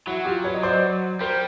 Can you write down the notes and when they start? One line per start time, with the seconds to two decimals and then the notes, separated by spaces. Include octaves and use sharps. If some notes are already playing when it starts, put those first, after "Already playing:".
0.07 F#3 E4 F#4
0.25 F4 G4
0.44 B4 C#5
0.54 D#5
0.63 C5 D5
1.21 G3 A#4 C5